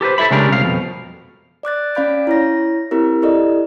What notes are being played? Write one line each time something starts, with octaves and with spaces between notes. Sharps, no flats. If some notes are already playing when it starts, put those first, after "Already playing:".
G4 A4 B4 C5
A4 C#5 E5 B5
C#3 G#3 A3 D4 G4 A#4
C2 F5
F2 B2
D5 D6 F#6 A6
C#4 D5 F5 B5 G6 D7
E4 C#5 A#6
C4 E4 G4 A#4
E4 G4 A4 D5 D#5